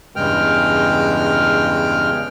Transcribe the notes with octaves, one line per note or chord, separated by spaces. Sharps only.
E2 G2 C#3 G#3 G5 F6